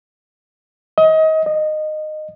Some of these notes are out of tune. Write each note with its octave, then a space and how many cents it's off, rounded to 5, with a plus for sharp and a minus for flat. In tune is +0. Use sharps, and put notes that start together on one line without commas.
D#5 +30
D#5 -15